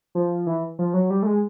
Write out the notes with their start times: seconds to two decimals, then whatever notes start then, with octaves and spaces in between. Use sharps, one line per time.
0.15 F3
0.47 E3
0.79 F3
0.94 F#3
1.10 G3
1.23 A3
1.27 G#3